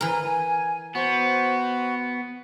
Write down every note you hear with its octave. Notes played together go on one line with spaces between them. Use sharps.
E3 A#4 G#5
B3 F#4 C5